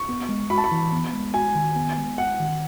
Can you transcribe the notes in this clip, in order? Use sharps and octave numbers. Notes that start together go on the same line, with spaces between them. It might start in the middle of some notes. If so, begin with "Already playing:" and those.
Already playing: C#6
B3
G#3
F#4 B5
A5
B5
E3
B3
G#3
F#4 G#5
D#3
B3
G#3
F#4 F#5
D#3